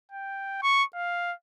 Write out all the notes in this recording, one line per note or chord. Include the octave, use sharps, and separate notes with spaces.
G5
C#6
F5